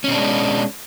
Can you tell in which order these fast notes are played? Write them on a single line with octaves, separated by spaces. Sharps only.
C#4 B2 D4 G#3